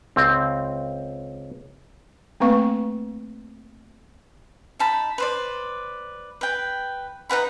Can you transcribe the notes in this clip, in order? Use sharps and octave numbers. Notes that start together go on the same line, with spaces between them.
C#2 C4
A3 A#3 C4 B4 F5 C#6
D#4 A5 B5
B4 C5 D5
B4 G5
D#4 B4 F#5 B5